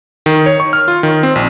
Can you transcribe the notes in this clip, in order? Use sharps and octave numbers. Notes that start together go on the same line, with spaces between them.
D#3
C#5
C#6
F6
F4
D#3
C4
A#1